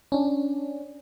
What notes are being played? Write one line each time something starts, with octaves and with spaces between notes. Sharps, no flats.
C#4 D4